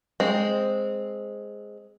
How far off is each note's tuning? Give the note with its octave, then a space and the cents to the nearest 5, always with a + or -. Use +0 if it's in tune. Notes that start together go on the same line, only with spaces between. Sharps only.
G#3 +0 C4 +0